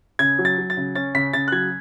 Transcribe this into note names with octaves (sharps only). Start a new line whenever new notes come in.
C#3 G#6
F#3
A6
F#3
A6
C#3
C#4 A6
C#3 B6
C#3 A6
F#6
F#3 G#6